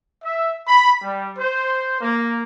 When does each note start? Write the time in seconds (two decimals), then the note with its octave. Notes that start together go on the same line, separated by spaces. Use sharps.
0.23 E5
0.67 B5
1.01 G3
1.36 C5
2.01 A#3